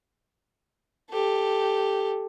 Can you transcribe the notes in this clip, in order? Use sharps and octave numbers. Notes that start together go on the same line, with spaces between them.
G4 A4